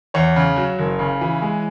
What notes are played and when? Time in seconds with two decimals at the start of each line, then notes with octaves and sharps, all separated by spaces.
0.14 E2 C#5
0.36 C#3
0.56 F#3
0.79 F#1
0.99 C#3
1.21 E3
1.42 G#3